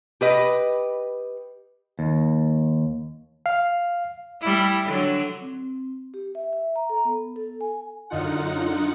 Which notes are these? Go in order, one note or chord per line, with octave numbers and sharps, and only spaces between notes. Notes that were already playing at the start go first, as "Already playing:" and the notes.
G4 B4 D#5
D#2
F5
G3 E4
D3 F#3
C4
G4
E5
E5
A#5
A4
B3
A4
G#5
F#2 D3 D#4 F4 F#5